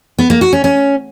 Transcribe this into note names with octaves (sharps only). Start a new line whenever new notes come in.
B3
A#3
F#4
C#4
C#4